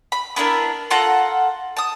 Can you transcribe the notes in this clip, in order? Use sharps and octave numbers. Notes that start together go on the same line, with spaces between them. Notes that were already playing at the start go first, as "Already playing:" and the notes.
B5
B3 D4 E4 A#4
F4 A4 F#5 A#5
A5 D#6